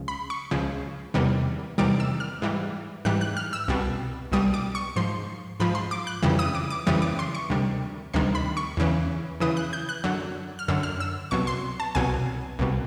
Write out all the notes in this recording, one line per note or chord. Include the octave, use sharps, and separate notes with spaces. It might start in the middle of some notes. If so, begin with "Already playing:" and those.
Already playing: C#2 C#3 F3
B5
C#6
C#2 C#3 F3
E2 C3 D#3 G3
E2 C3 D#3 G3 D6
E6
F6
G#2 E3 G3
G#2 E3 G3 F#6
F#6
F6
E6
C2 B2 G3
C2 B2 G3 D#6
D6
C#6
G#2 F3 C6
G#2 F3 B5
C6
D6
F#6
F2 C#3 E3 G3
D#6
D6
D6
F2 C#3 E3 G3 D#6
D6
C6
C#6
D2 C3 D#3 G3
D2 C3 D#3 G3 C6
B5
C#6
E2 C#3 E3
E2 C#3 E3 D#6
F#6
G6
F#6
F#2 D3 F#3
F6
F#2 D3 F#3 E6
F6
E6
C2 B2 F#3 C#6
C6
A5
C2 B2 F#3 G#5
C2 B2 G3